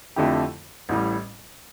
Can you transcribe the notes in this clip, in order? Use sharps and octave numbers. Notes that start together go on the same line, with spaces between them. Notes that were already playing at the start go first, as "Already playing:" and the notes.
F2 D3 A3 E4 G4
A1 A2 G3